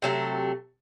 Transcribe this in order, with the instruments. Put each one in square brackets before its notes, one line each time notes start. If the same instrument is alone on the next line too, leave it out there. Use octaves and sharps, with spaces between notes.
[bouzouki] C3 F#3 A3